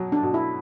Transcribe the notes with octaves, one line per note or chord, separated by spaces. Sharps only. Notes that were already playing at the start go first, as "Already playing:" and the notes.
Already playing: B2 F#3
D4
B2
E4